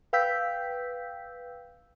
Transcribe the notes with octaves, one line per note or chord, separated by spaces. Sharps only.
B4 F5 G5 E6 G6 B6